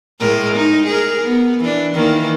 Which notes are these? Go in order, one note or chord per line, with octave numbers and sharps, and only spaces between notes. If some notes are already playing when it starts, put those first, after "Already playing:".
A2 G#3 A#4
D#4
G#4 A#4
B3
E3 D4
D#3 E3 A#3